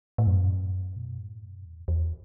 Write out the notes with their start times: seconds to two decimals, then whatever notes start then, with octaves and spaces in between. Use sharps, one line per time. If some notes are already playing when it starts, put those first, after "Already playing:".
0.18 A2
0.27 F#2
0.96 B2
1.19 A2
1.42 F#2
1.65 E2
1.88 E2